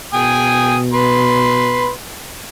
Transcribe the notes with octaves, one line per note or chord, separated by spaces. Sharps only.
B2 G5 G#5 D#6
B4 C6